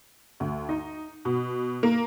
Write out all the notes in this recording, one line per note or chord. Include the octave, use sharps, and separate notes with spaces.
D2
D#4
B2
A#3